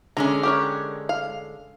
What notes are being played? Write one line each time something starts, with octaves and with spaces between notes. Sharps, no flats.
D3 G#3 C#4 A#5
G4 A#4 C#5
F5